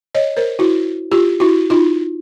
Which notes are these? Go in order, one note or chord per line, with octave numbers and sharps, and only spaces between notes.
C#5 D#5
A#4 C5
E4 F#4
F4 G4
E4 F#4
D#4 F4